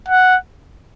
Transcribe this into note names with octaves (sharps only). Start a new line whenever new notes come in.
F#5